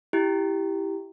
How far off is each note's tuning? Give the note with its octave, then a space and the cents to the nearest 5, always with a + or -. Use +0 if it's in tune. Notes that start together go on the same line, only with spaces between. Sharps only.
E4 +0 G4 +0